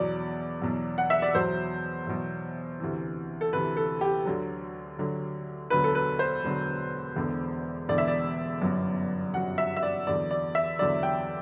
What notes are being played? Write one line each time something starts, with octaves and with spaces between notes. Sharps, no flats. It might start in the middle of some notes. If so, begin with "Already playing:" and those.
Already playing: E2 B2 F#3 D5
E2 B2 F#3
F#5
E5
D5
E2 B2 F#3 C5
E2 B2 F#3
D2 C3 E3
A4
D2 C3 E3 B4
A4
G4
D2 D3 F#3
D2 D3 F#3
E1 D2 D3 F#3 B4
A4
B4
C5
E1 D2 D3 F#3
E1 E2 D3
E1 E2 D3 D5
E5
D5
G1 F#2 F#3
G1 F#2 F#3 F#5
E5
E5
D5
E2 D3 F#3 D5
D5
E5
E2 D3 F#3 D5
G5